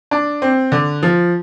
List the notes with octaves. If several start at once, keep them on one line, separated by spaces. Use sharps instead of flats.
D4
C4
D3
F3